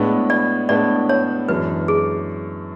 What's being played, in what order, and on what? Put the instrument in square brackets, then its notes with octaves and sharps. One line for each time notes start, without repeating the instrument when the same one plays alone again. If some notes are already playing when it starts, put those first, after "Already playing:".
Already playing: [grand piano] A2 G#3 B3 D4
[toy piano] D5
[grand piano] A2 G#3 B3 D4 [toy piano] D5
[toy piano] C#5
[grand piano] F#2 E3 G#3 D4 [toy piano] B4
[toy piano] G#4